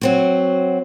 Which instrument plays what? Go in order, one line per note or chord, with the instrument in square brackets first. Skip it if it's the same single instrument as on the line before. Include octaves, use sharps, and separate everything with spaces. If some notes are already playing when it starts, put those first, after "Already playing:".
[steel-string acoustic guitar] F#3 C4 F#4